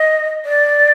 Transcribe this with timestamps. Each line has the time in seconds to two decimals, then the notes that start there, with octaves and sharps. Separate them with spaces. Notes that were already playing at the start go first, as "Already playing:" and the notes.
Already playing: D#5
0.45 D5